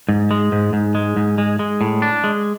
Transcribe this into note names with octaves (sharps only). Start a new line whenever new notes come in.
G#2
G#3
G#2
G#2
G#3
G#2
G#3
G#3
A2
D4
G#3